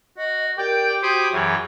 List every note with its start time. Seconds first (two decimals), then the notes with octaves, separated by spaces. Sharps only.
0.18 F#4 D#5
0.58 G4 A#4 D5 G5
1.03 F#4 C5 G#5 B5 D#6
1.32 F#2 E3 G#4 C#5